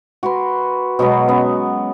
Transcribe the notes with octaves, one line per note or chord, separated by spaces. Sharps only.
F#4 A#4 B4 C6
B2 F#3 G#3 B3
B3 C#4